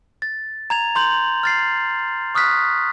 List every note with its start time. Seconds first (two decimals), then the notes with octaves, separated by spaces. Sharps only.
0.22 A6
0.70 A#5 G#6 F7
0.95 A#5 C6 G6 F#7
1.43 F6 A6 C7
2.35 C#6 D#6 F6 F#6 B6